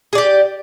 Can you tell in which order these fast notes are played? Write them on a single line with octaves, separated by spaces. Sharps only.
G#4 D5 G4